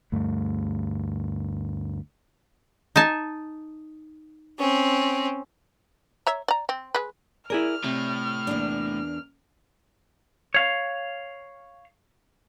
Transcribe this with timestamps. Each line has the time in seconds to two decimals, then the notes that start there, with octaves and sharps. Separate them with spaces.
0.12 D2 G2 A3
2.96 D#4 G#5 A5
4.58 C4 C#4
6.27 C#5 E5 A#5
6.48 D5 A#5
6.69 C4
6.95 G#3 B4
7.50 E4 G#4 A#4 D5 F6
7.84 A2 C3
8.47 E2 A#3 D4
10.54 C#5 F5